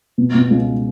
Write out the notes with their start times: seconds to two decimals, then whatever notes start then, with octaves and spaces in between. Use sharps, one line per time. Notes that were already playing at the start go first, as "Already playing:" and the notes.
0.18 B2
0.35 B2
0.50 C#2